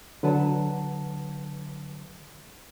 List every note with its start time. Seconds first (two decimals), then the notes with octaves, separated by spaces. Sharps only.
0.23 D3 F#3 B4 F#5 A5